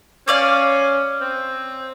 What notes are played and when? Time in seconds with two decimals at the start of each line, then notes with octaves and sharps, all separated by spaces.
0.28 C#4 C#5 D5 F5
1.21 C4